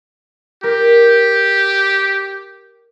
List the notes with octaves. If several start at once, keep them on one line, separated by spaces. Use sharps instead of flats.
G4 A#4